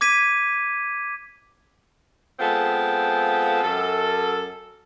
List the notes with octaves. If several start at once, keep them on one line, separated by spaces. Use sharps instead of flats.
D6 G#6 B6 D#7
G#3 B3 C4 F4 A4
F#2 A4